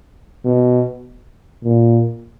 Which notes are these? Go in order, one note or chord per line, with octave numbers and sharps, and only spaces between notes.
B2
A#2